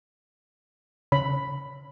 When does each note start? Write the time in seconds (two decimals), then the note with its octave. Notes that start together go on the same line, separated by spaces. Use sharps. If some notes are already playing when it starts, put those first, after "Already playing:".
1.12 C#3 B5